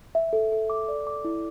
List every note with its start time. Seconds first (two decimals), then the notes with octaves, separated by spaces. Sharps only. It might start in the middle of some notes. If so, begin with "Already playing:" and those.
0.15 E5
0.33 A4
0.52 A4
0.70 D6
0.88 D5
1.07 D6
1.25 E4